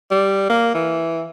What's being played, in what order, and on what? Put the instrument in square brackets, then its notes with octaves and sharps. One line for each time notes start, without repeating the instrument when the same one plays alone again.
[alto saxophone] G3
A#3
E3